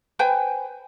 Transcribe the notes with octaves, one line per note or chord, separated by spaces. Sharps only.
B4 C5 G5 G#5